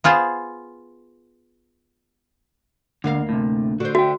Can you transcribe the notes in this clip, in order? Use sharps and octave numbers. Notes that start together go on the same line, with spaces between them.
B3 F4 G#4 C5
D2 D3 A#3 F5
A2 C3
D3 F#4 C5
F#4 E5 G5